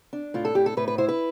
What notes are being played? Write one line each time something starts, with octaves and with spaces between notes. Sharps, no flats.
D4
A2 F4
A4
A2 G4
A4
A2 B4
B4
E4 C5
B4